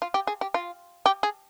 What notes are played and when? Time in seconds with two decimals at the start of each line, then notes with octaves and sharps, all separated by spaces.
0.02 F4
0.14 G4
0.27 G#4
0.41 G4
0.54 F4
1.06 G4
1.23 G#4